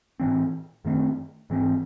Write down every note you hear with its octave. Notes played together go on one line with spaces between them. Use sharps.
A2 E3 C4
F#2 D#3 A3 C4
G#2 E3 C4